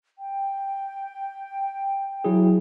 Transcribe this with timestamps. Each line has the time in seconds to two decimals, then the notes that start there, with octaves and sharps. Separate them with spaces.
0.19 G5
2.24 F#3 E4 G#4